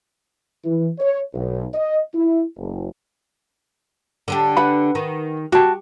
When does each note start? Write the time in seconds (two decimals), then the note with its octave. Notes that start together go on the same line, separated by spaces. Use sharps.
0.64 E3
0.99 C#5
1.34 B1
1.74 D#5
2.14 E4
2.57 F#1
4.28 D3 D4 G4
4.57 B4 F#5 B5
4.95 D#3
5.52 F#4 G4 A5